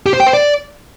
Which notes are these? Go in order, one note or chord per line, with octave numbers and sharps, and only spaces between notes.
G4
C5
G5
C5
D5